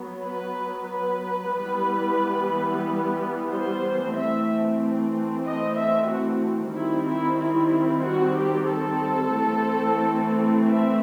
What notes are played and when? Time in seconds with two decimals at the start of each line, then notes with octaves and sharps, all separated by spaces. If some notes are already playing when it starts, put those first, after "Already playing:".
Already playing: F#3 B3
0.24 B4
0.89 B4
1.54 E3 G3 B3
3.50 C5
4.15 E3 A3 C4 E5
5.45 D#5
5.77 E5
6.10 F#4
6.75 D#3 G3 C4 E4
7.08 E4
7.40 E4
8.06 F#4
8.38 G4
8.71 A4
9.36 E3 A3 C4
10.66 E5